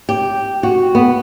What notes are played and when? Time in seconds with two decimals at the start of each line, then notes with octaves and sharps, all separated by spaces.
0.09 G4
0.63 F#4
0.95 B3